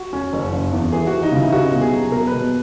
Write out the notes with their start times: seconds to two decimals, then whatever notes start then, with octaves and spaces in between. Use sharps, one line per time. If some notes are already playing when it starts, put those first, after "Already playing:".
Already playing: F#4
0.13 C#4
0.33 F#1
0.52 F#1
0.73 E2
0.92 E3 G#4
1.07 F#4
1.12 E3
1.23 D#4
1.32 C#3
1.37 E4
1.52 C#2 F#4
1.72 B2
1.81 G#4
1.92 F#3
2.11 B2 A#4
2.27 B4
2.32 B2